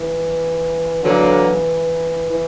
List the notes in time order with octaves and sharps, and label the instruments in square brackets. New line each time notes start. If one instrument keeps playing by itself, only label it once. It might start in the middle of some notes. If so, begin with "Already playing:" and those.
Already playing: [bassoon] E3
[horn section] D3 F#3 A#3 [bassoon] E3
[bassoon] E3